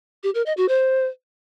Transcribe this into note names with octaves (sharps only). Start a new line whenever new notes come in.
G4
A#4
D#5
F#4
C5